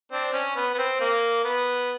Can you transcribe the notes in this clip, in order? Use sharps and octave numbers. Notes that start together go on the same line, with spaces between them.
C4 D4
C#4
B3
B3
C4
A#3
B3